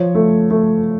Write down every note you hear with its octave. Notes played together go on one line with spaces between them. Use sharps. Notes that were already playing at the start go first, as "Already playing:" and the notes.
Already playing: F3 C#5
A3
A3